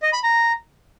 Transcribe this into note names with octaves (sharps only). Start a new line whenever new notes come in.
D#5
B5
A#5